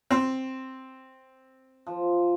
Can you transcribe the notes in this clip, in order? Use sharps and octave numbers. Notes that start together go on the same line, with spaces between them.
C4
F3